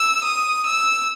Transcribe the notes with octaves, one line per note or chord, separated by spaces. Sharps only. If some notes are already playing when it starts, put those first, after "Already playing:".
Already playing: E6
D#6
E6